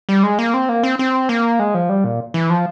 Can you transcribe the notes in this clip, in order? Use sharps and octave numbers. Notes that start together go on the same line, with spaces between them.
G3
G#3
A#3
C4
A#3
C4
C4
A#3
G#3
F3
G3
A#2
E3
F3